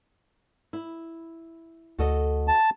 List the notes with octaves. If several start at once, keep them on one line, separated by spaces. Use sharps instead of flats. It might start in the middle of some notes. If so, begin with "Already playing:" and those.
E4
D2 F#4 A4 D#5
A5